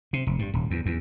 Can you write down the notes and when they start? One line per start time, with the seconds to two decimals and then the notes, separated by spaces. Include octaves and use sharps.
0.13 C3
0.27 F1
0.39 G2
0.54 D#1
0.71 E2
0.86 E2